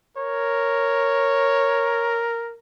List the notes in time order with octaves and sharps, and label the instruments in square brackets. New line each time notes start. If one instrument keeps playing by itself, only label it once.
[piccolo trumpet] A#4 [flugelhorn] C#5